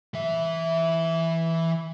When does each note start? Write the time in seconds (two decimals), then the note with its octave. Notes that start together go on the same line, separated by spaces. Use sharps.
0.14 E3 E5